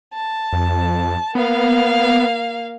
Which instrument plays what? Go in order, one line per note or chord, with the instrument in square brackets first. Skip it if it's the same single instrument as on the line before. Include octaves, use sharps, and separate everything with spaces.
[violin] A5
[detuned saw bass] F2
[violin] A#3 F5 [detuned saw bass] B3